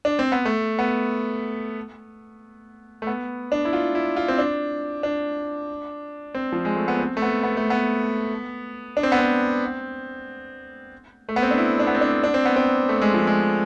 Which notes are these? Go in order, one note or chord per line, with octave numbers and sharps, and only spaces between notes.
D4
C4
B3
A3
B3
A3
B3
D4
E4
F4
E4
F4
C4
D4
D4
C4
F3
G#3
A3
B3
C4
A3
B3
B3
A3
B3
D4
C4
B3
C4
A3
B3
C4
D4
E4
D4
B3
C4
D4
D4
C4
B3
C4
A3
G#3
F3
G#3